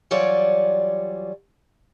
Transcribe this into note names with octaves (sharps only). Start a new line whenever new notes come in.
E3 F#3 G3 F4 C#5 D5